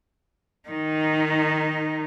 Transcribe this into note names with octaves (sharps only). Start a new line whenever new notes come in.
D#3 D#4